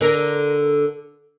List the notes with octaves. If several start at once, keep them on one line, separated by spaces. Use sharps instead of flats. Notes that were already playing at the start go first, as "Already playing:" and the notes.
D3 A#4